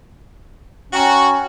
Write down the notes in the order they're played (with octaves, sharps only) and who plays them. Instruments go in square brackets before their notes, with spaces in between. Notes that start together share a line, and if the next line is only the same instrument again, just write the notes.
[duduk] C#4 [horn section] F#4 [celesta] G5 A#5 C#6